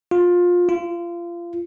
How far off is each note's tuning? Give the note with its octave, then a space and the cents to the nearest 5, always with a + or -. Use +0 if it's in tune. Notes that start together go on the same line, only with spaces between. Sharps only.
F4 +20
F4 -25